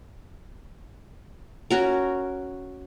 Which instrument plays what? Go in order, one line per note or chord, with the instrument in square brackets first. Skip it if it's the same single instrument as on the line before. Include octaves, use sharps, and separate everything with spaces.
[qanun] C#4 F#4 A#4